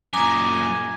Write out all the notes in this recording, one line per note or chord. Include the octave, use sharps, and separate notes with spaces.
F#2 A#2 G#5 A#5 D6 D#6